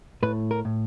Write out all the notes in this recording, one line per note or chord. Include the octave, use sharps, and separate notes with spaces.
A2 B4
A#4
A2